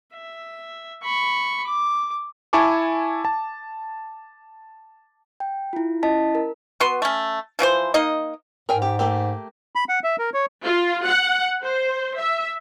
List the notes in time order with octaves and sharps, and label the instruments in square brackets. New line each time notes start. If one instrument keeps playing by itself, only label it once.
[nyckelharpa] E5
B5 C#6
D6
[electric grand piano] E4 G#5 A5 C#6 D6
A5
[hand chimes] G5
E4 F4
C#4 E4 D#5 A5 B6
A#4
[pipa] B3 F#4 B4 C6
A3 C#4
E3 F3 F#4 C5
A#3 D#4 D#5
[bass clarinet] G#2 [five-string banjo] A#4 G5 G#5
[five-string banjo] G4
A3 A#3 G4
[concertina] B5
F#5
E5
A#4
C#5
[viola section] F4
F#5
C5
E5